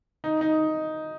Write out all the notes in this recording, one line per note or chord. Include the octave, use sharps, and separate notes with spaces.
D#4
D#4